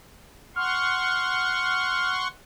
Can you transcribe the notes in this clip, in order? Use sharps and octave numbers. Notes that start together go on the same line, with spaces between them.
F#5 C6 C#6 F6